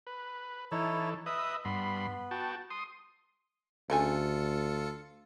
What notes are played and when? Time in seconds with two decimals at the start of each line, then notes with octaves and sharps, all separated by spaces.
0.07 B4
0.72 E3 D#4 E4 A4 C#5
1.26 B4 D#5 E5 D#6
1.65 G2 B3 B5 C6
2.31 F#4 G5 A5
2.70 C6 D#6
3.90 D2 C#3 A3 F4 A4 G#5 C#7